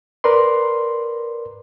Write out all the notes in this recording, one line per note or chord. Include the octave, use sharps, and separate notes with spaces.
A#4 B4 D5 C6